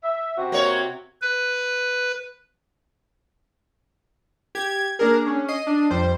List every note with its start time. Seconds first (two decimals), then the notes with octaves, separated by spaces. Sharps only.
0.03 E5
0.37 C3 C4 F#4
0.52 A#3 C#5
1.22 B4
4.55 G4 G#6
4.99 A#3 D4 G#4 A#4
5.26 C#4
5.48 D#5 C7 D#7
5.67 D4
5.90 F2 G3 C5